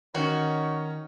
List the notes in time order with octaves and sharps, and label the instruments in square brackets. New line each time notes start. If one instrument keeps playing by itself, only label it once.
[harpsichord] D#3 [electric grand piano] C#4 C#5 [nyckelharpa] D#4 [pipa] F#4